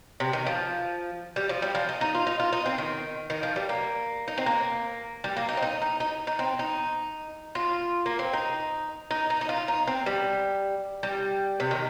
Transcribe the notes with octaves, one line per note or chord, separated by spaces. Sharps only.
C3
D#3
F3
G3
F3
G3
F3
D#4
D#4
F4
D#4
F4
D#4
C4
D#3
D#3
F3
G3
A#3
D#4
C4
A#3
G3
A#3
D#4
C4
D#4
D#4
D#4
D#4
C4
D#4
F4
A#3
C4
D#4
D#4
D#4
D#4
F4
D#4
C4
G3
G3
C3
D#3